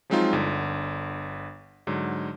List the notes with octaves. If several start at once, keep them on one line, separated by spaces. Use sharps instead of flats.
F3 F#3 G#3 C4 D#4 F4
G1 D3
G#2 D3 F#3